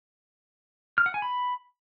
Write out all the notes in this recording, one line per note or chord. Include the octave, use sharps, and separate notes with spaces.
F6
F#5
G#5
B5